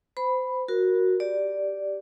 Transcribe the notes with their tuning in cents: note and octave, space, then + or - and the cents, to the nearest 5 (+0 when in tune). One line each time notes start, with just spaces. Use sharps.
C5 -25 B5 +0
F#4 -5 A#4 +0
G4 +0 D5 +0